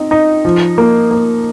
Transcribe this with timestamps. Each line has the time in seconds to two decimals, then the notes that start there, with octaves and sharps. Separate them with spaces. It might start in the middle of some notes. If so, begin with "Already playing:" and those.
Already playing: C4 D#4
0.11 D#4
0.45 F3
0.78 A#3
1.11 A#3